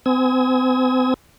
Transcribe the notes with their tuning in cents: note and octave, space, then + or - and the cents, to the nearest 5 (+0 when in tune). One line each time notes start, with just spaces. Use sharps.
C4 -40 G#5 +0 D#6 +45